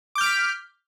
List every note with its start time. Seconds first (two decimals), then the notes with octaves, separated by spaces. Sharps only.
0.15 D6
0.18 G6
0.21 F6
0.23 D7
0.26 B6